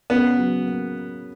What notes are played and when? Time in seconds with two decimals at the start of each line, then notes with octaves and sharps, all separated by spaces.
0.10 C#3 B3
0.38 F#3
0.66 A#3